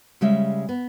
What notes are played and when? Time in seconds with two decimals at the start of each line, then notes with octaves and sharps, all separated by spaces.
0.21 C#3 G3 G#3 E5
0.69 B3